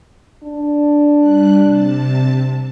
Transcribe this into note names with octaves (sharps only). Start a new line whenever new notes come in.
D4
G3 F#6
C3 A5